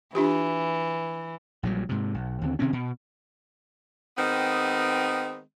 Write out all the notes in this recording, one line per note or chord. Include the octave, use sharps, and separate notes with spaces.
E3 D4 F4 G4
A#1 A#2 F#3 G3
G#2 C3
B1
D#2 D3 C4
C3 D#3 C4 C#4
B2
D#3 G#3 B3 C4